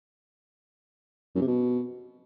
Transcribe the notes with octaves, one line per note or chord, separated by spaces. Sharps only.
F#2
C3
B2